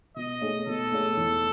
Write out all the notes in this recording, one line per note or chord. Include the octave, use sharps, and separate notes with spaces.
B2 D#5
A3 D#4 G#4 C#5
B2 A4
A3 D#4 G#4 C#5
E2